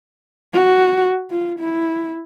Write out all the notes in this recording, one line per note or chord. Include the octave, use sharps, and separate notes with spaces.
F#4
F4
E4